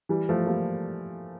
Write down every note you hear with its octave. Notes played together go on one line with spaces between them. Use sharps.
E3 G3
F3 A3
G3 A#3